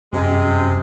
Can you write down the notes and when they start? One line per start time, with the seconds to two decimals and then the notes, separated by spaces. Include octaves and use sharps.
0.13 F#2 C3 G#3